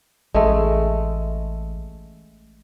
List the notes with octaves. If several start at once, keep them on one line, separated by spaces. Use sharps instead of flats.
A1 G#3 A3